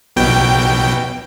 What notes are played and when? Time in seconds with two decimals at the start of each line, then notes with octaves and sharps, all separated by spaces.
0.16 B1 B2 G5